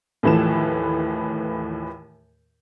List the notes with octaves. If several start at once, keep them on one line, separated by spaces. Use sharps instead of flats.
D#2 A2 E3 F3 E7